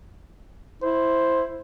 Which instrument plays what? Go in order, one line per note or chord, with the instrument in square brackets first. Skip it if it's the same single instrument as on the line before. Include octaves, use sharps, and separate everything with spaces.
[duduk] E4 [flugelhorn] C5